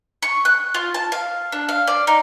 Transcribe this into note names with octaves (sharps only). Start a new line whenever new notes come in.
C#6
F#6
F4
A5
F5
D4
F5
D5
D#4